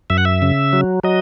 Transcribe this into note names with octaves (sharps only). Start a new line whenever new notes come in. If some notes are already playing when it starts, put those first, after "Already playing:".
F#2 E5
F#5
E5
C#3
F#3
F#3 D#5